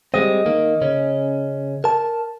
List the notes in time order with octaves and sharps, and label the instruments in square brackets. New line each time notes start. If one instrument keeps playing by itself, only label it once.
[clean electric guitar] G3 G#3 C4 [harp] D#5
[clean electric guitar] D#3 A#3
C#3 C#4
A#4 A5